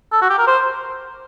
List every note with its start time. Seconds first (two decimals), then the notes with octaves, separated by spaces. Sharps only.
0.12 A4
0.22 F#4
0.30 G4
0.39 A#4
0.47 C5